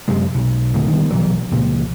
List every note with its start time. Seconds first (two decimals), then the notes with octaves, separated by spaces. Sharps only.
0.08 F#2 C3 G#3
0.34 B1
0.74 D2 A2 D3 D#3
0.92 D#3 G3 B3
1.09 E1 A#1 E3 F#3
1.51 C#2 A#2 F3